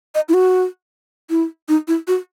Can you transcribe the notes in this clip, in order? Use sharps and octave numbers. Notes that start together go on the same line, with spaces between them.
D#5
E4
F#4
E4
D#4
E4
F#4